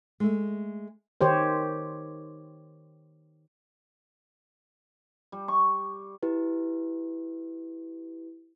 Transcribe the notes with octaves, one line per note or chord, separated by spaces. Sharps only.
G#3 A3
D#3 G4 C5 C#5
G3
C#6
E4 G4 B4